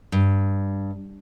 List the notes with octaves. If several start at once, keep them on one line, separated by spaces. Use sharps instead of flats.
G2